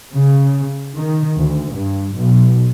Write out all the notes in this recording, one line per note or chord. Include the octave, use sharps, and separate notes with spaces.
C#3
D#3
D2
G2
B1